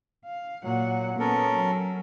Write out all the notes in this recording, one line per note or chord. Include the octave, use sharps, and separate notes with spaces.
F5
A#2 F#3 F#5
B3 C#4 A4 A#4
F#3